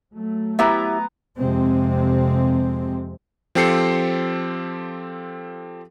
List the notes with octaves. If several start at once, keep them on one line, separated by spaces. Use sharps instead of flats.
F#3 A3
B3 E4 G4 E5 A#5
F2 C3 G#3 C4
F3 C4 G4 A4 C7 C#7